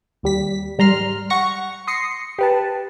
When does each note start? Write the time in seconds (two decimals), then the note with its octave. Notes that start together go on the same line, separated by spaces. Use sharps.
0.23 D#2 G3 B6
0.78 G#2 G3 A#5 C6 F6
1.30 F#5 C#6 A#6 C#7
1.87 C6 D#6 A#6 C7 C#7
2.39 G4 B4 A5